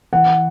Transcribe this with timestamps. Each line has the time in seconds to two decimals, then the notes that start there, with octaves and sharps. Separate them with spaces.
0.12 E3 F#5